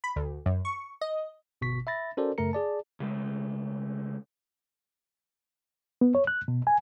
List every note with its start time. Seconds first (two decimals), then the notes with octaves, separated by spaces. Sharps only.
0.04 B5
0.16 D2
0.46 F#2
0.65 C#6
1.01 D#5
1.61 G1 B2 C#6 B6
1.87 E5 B5 A6 A#6
2.17 C#4 F#4 A4 A#4 C5 D5
2.38 F#2 C#3 A3 A#4 A#5 C#7
2.53 G#4 D5 A5
3.00 C#3 G#3 A3
6.01 B3
6.15 C#5
6.27 F#6
6.48 B2
6.67 G#5